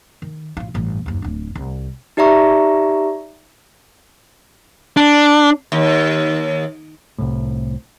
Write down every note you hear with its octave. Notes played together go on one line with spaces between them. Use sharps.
D#3
A1 F4
A1 G2
F#1 D#2
D1 D4
C2
D#4 G4 D5 E5 A#5 C#6
D4
D#2
C2 A2